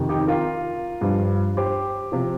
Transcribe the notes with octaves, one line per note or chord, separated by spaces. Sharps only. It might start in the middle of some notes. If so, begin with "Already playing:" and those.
Already playing: F2 C3 D#3
D#4 G4
F4 A#4
G2 F3
G4 C5
C3 F3